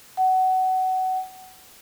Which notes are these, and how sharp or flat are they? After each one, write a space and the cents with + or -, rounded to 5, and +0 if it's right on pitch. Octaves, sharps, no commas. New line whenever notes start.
F#5 +20